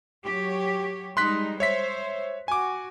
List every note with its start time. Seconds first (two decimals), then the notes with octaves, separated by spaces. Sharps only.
0.25 F#3 G4 C#5
1.17 G3 G#3 D#4 C6 F#6 B6
1.60 C5 C#5 E5 B6
2.48 F#4 G#5 D6